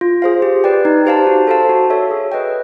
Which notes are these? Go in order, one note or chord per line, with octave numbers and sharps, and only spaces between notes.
F4
G#4 C5 F5
G4
B4 D5 G5
D#4
G4 C5 F5 A5
F#4
A4 C5 F5 A5
F#4
A4 C#5 E5
G#4
B4 D#5 G5